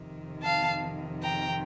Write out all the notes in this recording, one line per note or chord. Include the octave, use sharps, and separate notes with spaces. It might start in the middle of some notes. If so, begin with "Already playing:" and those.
Already playing: F2 C3 D#3
F5 A5
G5 A#5